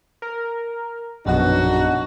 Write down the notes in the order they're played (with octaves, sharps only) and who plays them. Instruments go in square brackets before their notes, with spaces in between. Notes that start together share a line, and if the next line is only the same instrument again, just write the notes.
[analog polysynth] A#4
[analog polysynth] A#1 F#2 B2 [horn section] D4 D#4 F#4